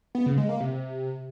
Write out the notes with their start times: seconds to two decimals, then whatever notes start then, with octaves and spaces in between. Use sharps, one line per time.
0.15 B3
0.26 C#3
0.37 G#3
0.49 A#3
0.60 C3